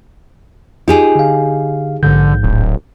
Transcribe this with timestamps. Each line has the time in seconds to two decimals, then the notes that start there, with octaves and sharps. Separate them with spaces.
0.88 D#4 F4 G4 G#4
1.15 D3 F5
2.03 A#1 G#2 D3 G6
2.43 D1